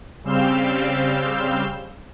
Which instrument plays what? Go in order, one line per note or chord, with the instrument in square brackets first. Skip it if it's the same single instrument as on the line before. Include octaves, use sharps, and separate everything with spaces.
[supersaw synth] C#3 G3 C4 F5 E6 G6